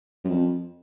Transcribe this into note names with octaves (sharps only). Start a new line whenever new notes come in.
F#2
F2